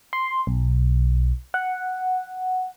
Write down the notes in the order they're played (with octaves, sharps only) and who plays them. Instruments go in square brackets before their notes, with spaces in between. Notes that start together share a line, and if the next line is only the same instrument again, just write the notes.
[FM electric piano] C6
B1
F#5